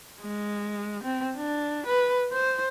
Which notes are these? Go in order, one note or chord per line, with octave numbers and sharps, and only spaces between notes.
G#3
C4
D4
B4
C5